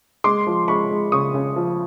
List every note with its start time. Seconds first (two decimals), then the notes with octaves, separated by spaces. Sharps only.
0.24 G#3 C6 D6
0.47 F3
0.68 G#3 B5 C#6
0.91 G#3
1.12 C#3 C#6 D#6
1.34 C#3
1.56 F3